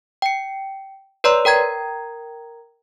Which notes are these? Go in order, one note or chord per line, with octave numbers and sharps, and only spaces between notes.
G5 C#7
B4 C#5 D5 A#5 C6 E6
A#4 G5 A#5 G#6